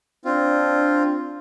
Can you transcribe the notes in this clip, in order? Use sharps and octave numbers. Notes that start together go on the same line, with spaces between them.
C4 D4 F4